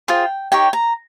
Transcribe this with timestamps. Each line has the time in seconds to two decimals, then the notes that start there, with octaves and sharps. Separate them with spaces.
0.08 F4 G#4 C5 G5
0.52 D#4 G4 C#5 G5
0.73 A#5